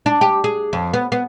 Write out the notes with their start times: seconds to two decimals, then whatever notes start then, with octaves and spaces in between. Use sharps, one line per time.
0.06 D4
0.21 G4
0.44 G#4
0.73 F2
0.93 B3
1.12 B3